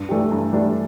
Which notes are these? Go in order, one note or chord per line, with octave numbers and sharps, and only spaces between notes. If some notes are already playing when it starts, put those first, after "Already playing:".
Already playing: G2
E3 A3 D4 G4
G2
E3 A3 D4 G4